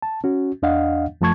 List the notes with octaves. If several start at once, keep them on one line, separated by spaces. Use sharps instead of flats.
A5
C#4 F#4
E2 D4 D#5 F5 F#5
F#2 F3 A3 A5 C#6 G#6